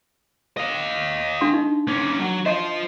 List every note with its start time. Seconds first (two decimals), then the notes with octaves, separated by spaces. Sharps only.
0.57 D#5 F5
1.41 D4 C6
1.53 D#4
1.87 A#3 C#4
2.20 F#3
2.46 F4 C5 D#5